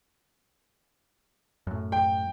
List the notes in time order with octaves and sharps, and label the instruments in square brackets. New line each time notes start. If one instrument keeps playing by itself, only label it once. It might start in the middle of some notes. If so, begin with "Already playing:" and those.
[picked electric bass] F#2 A2
[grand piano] G5